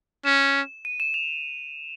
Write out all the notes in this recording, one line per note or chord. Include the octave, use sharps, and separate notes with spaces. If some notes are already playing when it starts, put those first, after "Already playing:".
C#4 E7
D#7
E7
F7